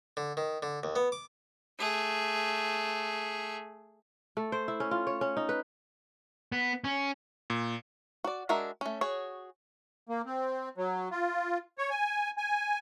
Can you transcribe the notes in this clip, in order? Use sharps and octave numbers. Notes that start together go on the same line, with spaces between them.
D3
D#3
D3
D#2
B3
D6
A3 G#4
A3
C5
E4
C#4
F4
C#5
C#4
D#4
B4
B3
C#4
A#2
F#4 D5
G#3 D4 F#4 A#4 E5
A3 C#4
F#4 G#4 C#5
A#3
C4
F#3
F4
C#5
G#5
G#5